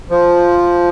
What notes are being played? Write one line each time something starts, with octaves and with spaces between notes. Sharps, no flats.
F3